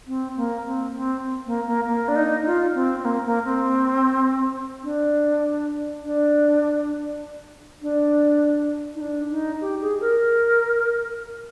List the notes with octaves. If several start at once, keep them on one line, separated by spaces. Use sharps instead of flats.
C4
A#3
C4
C4
A#3
A#3
A#3
D4
D#4
F4
C4
C4
A#3
A#3
C4
D4
D4
D4
D#4
D4
D#4
G4
G#4
A#4